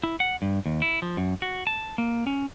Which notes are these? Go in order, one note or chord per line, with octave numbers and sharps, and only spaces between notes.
E4
F#5
G2
D#2
E4
F3
F#2
F#4
A5
A#3
C#4